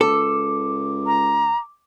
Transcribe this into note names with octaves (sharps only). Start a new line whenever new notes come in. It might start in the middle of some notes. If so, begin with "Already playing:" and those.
C#2 A4 D6
A#5